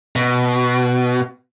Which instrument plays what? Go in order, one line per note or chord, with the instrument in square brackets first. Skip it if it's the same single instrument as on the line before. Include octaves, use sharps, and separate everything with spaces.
[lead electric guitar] B2